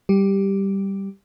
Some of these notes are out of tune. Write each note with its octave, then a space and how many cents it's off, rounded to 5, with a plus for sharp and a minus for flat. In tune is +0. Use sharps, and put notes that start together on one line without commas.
G3 +0 G4 +0